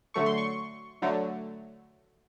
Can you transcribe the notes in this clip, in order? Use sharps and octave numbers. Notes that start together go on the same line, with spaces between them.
D3 F#3 A3 C#6
C6
C#6
D3 F#3 A3